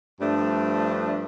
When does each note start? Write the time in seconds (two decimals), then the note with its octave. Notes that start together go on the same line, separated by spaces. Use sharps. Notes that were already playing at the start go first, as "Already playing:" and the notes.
0.18 G2 F3 A3 D4